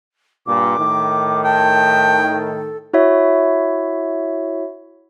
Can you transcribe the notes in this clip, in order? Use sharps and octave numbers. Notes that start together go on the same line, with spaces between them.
G2 A#2 D6
A2 D#3
G5 A5
A4
E4 F#4 C#5 E5